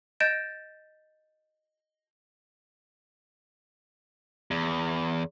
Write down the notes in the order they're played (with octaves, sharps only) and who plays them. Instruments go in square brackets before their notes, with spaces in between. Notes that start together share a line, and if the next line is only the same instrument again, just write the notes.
[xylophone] D#5 G6 A6 D7 E7
[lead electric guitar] E2